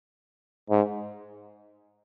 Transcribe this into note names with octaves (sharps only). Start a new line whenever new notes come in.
G#2